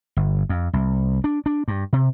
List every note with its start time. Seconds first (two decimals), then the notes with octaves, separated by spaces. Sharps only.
0.17 G1
0.49 F2
0.73 C2
1.24 D4
1.46 D4
1.68 G2
1.93 C3